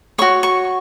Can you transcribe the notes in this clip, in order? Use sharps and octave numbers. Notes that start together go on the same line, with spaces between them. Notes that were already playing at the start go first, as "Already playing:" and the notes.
F#4 C#5 C#6
C#6